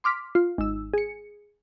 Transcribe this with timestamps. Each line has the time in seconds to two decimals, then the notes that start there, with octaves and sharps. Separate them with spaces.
0.04 C6 D6 F6 B6
0.35 F4
0.58 G#1 E6
0.94 G#4 C#7